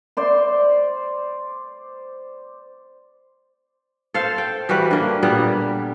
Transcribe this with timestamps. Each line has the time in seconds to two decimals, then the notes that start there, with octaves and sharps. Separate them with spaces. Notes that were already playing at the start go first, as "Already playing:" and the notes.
0.17 C5 D5 C6
4.14 A4 C5 F5
4.38 G5
4.69 E3 G3 F#4 B4
4.91 D3 A#3
5.23 A#2 G3 A#3 B3